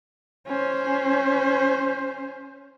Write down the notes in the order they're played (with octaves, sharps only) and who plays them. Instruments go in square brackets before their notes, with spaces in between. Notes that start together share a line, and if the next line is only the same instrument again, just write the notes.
[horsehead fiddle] C#4 C5